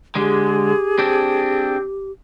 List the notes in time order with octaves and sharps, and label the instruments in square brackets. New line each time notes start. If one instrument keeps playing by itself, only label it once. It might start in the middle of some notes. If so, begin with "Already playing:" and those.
[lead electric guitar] D3 G#3 [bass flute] G4 [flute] G#4
[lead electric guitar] C4 D4